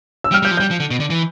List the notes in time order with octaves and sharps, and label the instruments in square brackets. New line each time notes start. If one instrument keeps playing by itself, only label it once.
[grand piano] E6
[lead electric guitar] G3 [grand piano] F6
[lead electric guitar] G3 [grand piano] G6
[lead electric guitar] F3
[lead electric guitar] G3 [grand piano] G6
[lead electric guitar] F3
D3
B2
D3
E3